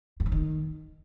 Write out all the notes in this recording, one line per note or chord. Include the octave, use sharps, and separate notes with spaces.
G2
D3
D#3